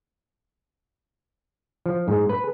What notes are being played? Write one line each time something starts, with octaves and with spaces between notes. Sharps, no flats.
F3
G#2
B4